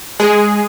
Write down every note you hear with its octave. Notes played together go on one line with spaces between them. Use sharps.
G#3 G#4